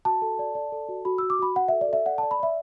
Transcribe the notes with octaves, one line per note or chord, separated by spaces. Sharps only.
F#4 A5
A4
D5
D5
A4
F#4
F#4 B5
F#4 E6
D6
F#4 B5
F#4 F#5
A4 E5
D5
A4 E5
D5 F#5
D5 A5
B5
D5 E5